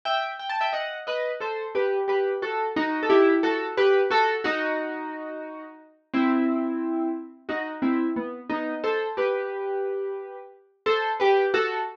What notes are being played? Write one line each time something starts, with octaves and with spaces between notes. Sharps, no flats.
E5 G5
G5
A5
E5 G5
D#5 F#5
B4 D#5
A4 C5
G4 B4
G4 B4
F#4 A4
D#4 F#4
A4
E4 G4
F#4 A4
G4 B4
F#4 A4
D#4 F#4
C4 E4
D#4 F#4
C4 E4
B3
B3 D#4
A4 C5
G4 B4
A4 C5
G4 B4
F#4 A4